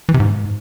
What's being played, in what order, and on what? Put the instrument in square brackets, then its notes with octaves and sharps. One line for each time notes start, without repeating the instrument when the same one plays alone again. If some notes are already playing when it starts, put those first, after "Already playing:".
[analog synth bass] E3
C3
G#2